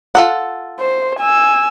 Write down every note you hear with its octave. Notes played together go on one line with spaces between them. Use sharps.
F4 A4 F#5
C5
G#5 E6